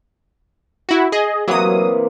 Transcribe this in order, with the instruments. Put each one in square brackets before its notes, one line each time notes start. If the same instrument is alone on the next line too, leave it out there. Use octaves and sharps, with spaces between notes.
[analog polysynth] E4 F#4
G#4 D#5
[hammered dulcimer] C3 E3 A#3 [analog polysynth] F#3 D#6